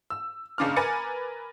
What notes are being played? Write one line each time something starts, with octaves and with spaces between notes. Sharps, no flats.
E6
F#1 C#3 D4 D6 F6
A#4 B4 G#5 A6 C#7